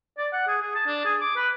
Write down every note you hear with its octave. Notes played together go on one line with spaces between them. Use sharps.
D5
F#5
G#4
G#4
A5
D4
G#4
D6
B4